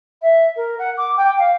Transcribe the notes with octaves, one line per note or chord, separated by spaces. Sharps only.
E5
A#4
F#5
D6
G5
F5